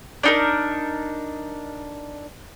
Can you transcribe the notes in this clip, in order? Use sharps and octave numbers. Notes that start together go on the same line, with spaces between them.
D4 D#4 A#4